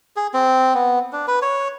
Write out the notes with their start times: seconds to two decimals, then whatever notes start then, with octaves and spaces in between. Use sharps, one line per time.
0.16 G#4
0.34 C4
0.74 B3
1.12 D4
1.27 B4
1.42 C#5